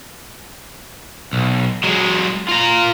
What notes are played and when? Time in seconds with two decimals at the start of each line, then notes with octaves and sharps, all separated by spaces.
1.33 B1
1.84 F#3 G#3
2.48 F4 A#5